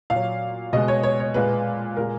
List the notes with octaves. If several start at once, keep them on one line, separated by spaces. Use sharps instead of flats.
A#2 F5
F#3
B2 G#3 D#5
C#5
C#5
C#5
A#2 G#3 B4
A#2 G#3 A#4